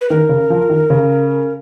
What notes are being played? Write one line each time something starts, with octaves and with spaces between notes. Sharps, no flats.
B4
D#3 A#4
C#3
F3
D#3
C#3